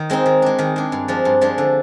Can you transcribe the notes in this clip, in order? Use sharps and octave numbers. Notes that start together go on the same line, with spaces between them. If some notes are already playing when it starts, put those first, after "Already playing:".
Already playing: D#3
G#3 C4 D#4
D#3
G#3 D4
D#3
G#3 D4
G2
F3 G#3 D4
G2
F3 G#3 D4
D3